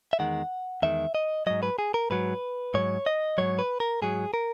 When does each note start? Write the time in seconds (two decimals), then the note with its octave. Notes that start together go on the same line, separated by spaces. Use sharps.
0.13 E5
0.19 E2 D#3 G#3 F#5
0.82 E2 D#3 G#3 E5
1.15 D#5
1.47 G#2 F#3 D#5
1.63 B4
1.79 G#4
1.94 A#4
2.10 G#2 F#3 B4
2.74 G#2 F#3 C#5
3.06 D#5
3.38 G#2 F#3 C#5
3.59 B4
3.80 A#4
4.02 G#2 F#3 G#4
4.34 A#4